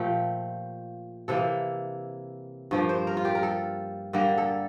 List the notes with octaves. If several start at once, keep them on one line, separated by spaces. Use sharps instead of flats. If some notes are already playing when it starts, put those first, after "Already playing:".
Already playing: A#2 F3 A3 G4
C3 E3 A#3 A4
G2 F3 A#3
C5
A#4
F4
G4
A#4
A4
D3 G3 A#3 A#4
A4